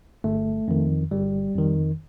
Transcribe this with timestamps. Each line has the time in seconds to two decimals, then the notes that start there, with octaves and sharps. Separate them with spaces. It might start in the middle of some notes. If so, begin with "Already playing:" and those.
0.24 G1 A3
0.68 F2 D#3
1.11 G1 G3
1.55 F2 D#3